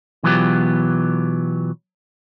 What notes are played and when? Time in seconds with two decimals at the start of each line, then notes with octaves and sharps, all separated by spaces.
0.23 B2 E3 F#3 B3 F4 G4